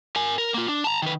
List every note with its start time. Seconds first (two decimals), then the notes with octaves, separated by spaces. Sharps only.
0.16 A#4 G#5
0.38 A#4
0.54 A#3 F4
0.68 D4
0.84 A5 A#5
1.02 D#3 B4